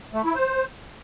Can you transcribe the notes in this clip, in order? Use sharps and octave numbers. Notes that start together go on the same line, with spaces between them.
A3
E4
C5